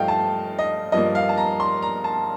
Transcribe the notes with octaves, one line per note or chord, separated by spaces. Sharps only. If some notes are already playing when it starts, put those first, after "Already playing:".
Already playing: G2 F3 A3 D#5 F5 G5
A5
D#5
G2 F3 A#3 D#5
F5
A5
A#5
C6
A#5
A5